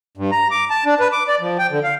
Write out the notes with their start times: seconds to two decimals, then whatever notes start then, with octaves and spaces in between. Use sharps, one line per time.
0.17 G2
0.32 A#5
0.51 D6
0.70 A5
0.86 D4
1.00 B4
1.12 D6
1.28 D5
1.40 F3
1.58 G5
1.70 D3
1.84 F5